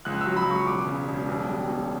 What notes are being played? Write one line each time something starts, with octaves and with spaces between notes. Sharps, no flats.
C#2 F#6
E6
F#3
B5
C#2 C#6
E1 D6
C#3
E1
B1
G3
B1